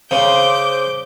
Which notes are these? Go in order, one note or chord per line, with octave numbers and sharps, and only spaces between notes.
C#3 C5 D6 G6